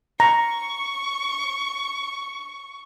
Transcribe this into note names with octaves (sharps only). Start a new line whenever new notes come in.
A#5 C#6